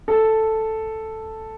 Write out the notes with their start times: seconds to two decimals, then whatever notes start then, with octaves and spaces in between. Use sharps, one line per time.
0.08 A4